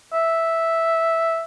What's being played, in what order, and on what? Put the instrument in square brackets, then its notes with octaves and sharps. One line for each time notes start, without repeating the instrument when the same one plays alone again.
[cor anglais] E5